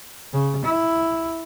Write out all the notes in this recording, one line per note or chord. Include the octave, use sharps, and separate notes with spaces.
C#3
E4